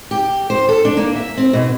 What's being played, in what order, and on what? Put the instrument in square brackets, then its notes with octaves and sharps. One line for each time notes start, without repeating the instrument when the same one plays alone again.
[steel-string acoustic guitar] G4
C5
A4
D4
A#3
E5
C4
B2